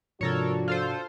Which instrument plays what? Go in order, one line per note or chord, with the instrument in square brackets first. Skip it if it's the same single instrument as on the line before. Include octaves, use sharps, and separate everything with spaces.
[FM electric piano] G#2 C3 [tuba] F3 [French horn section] D4 F#4 [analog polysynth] A4 A#4 C#5
[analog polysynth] F4 A4 C5